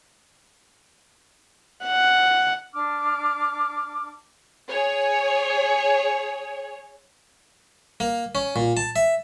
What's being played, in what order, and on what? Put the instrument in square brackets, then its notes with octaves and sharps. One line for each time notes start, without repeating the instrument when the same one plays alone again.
[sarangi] F#5
[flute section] D4 D6 F6
[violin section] G#4 C#5
[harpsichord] A#3
C#4
A#2
A5
E5